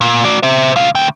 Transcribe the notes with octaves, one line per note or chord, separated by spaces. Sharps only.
A#2
F#4 D5
C5 E5
C#2 F5
D2 G5